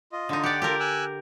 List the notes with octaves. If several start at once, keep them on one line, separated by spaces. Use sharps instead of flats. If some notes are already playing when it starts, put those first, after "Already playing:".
F4 D#5
D3 D#4
G4 D5 F#5 G5
F4 G4 A4 A#4
G#5 E6 F#6